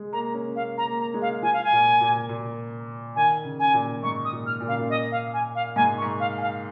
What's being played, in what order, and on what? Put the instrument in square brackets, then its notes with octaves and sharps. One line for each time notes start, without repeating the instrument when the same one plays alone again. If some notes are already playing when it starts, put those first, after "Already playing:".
Already playing: [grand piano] G#3
[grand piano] A#3 [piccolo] A#5
[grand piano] C#4
[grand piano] A#3 [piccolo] F5
[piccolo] A#5
[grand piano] A#3
[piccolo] A#5
[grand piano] G#3
[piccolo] F5
[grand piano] F3 [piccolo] G#5
[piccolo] F5
G#5
[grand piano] A#2
A#2
A#2
[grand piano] D#3 [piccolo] G#5
[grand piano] C#3
[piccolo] G#5
[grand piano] A#2
[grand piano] G#2 [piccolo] C#6
[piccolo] D#6
[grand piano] A#2
[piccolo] F6
[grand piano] A#2
[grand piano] C#3 [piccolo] F5
[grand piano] A#2
[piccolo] D#5
F5
G#5
F5
[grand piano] G#2 [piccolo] G#5
[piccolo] C#6
[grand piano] G#2
[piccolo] F5
G#5
F5